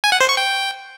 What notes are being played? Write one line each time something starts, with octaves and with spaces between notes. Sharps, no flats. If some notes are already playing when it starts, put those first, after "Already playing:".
G#5
F#5
C5
C#6
G5